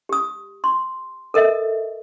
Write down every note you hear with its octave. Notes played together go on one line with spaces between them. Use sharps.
G4 D#6
C6
A4 A#4 D#5 E5